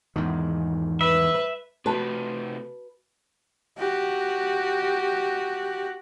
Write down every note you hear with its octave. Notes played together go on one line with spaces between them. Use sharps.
E2 G#2 D#3
B4 E5
C3 A3 F#4 B4 A5
F#4 G4